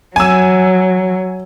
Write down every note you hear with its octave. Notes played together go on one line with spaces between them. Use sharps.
F#3 G#5 E6